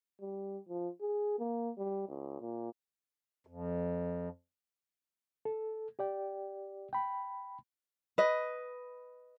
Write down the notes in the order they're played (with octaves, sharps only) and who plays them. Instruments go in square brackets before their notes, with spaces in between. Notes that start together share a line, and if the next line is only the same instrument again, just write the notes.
[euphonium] G3
F3
G#4
A#3
G3
C#2
A#2
[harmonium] F2
[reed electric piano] A4
G4 D5 G5
G5 B5
[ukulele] B4 D#5